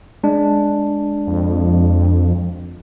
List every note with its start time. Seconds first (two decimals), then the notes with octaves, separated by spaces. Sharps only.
0.24 G#3 D4
1.27 F2